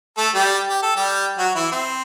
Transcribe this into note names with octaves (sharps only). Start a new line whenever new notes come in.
A3 A4
G3 G4
G4
A4
G3 G4
F#3 F#4
E3 E4
C4